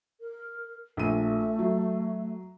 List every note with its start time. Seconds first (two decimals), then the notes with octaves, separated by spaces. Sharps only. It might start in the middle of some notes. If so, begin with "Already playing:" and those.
0.20 A#4
0.97 A#1 A3 D#7
1.59 F#3